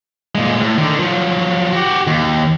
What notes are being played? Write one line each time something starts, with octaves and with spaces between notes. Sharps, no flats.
A#2 G#3
A2
D3 D#3
F3 F#3
F#4 G4
D#2